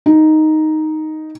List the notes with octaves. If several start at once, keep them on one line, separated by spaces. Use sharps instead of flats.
D#4